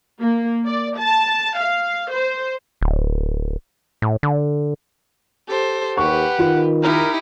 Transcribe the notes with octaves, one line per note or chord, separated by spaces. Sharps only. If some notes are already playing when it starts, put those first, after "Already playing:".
A#3
D5
A5
F5
C5
D1
A2
D3
G4 A4 C5
D#2 G4 B4 F#5 C#6
D#3 F4
D#4 E4 G4 A#4